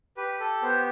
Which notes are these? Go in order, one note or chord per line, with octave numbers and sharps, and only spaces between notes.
G4 B4
A4
B3 C5